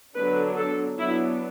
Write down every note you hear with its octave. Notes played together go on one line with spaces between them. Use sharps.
D3 F#3 B3 D4 B4
A4
F#3 B3 D4 E4